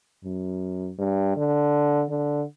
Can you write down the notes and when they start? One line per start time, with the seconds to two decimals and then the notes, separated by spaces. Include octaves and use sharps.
0.25 F#2
0.99 G2
1.36 D3
2.09 D3